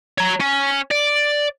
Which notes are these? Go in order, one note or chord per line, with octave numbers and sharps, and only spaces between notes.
C#5 A#5
C#4
D5